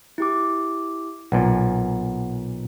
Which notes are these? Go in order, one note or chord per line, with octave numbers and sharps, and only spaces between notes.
E4 G4 D6
B1 A#2 F#5